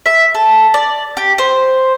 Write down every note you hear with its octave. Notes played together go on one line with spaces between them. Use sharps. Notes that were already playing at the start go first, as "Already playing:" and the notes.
E5
A4
D5
G4
C5